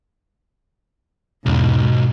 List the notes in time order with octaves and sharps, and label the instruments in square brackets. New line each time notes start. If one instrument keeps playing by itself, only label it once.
[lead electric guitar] B1 [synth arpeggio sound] E2 C#3 [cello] G#2